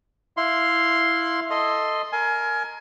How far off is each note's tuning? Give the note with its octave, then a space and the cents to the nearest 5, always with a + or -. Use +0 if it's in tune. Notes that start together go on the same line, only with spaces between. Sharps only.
E4 +0 F5 +5 C6 +0
A4 +0 D#5 +0 C6 +0
A#4 +0 G#5 +25